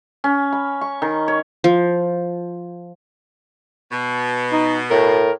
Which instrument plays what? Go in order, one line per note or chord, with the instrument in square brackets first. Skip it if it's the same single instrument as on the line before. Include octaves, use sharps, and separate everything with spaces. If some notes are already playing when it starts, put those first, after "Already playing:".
[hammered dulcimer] C#4
B5
C#6
D#3
C#5
[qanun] F3
[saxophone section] B2
[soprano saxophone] D#4
[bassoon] A2 [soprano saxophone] A#4